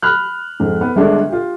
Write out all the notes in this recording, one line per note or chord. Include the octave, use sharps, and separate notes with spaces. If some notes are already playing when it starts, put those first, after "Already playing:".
B5 F6 F#6
F2 G#2
B3
G1 D3 G#3 D4
F4 G4